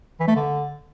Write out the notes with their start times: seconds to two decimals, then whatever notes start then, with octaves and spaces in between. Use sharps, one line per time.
0.20 E3
0.28 A3
0.35 D3